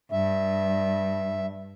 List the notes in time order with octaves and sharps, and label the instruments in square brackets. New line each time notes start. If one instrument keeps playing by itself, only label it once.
[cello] G2 [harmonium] E5